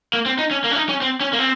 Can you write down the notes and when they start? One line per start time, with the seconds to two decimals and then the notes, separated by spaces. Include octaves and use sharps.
0.13 A#3
0.26 C4
0.39 D#4
0.51 C#4
0.64 A#3
0.71 C#4
0.76 D#4
0.89 C#4
1.02 C4
1.21 C#4
1.33 A#3
1.39 C4